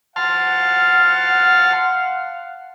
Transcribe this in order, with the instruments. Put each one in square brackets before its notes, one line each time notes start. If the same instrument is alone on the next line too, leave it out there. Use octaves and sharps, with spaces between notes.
[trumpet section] F5 F#5 [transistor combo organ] A5 C6 F6